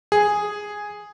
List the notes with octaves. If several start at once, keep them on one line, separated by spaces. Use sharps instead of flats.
G#4